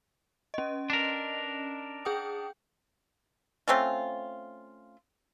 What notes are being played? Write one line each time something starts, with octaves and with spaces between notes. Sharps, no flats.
C#4 D#5
D4 A#4
G#4 G5 D#6
A3 C4 C#4 F4